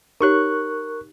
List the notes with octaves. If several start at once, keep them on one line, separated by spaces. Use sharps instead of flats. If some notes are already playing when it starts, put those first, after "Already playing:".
D#4 G4 A#4 C#5 C#6 F#6